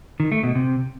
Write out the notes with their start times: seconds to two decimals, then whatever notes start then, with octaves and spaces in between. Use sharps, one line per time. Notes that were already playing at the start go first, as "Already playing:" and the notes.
0.20 D#3
0.32 A3
0.43 B2
0.55 C3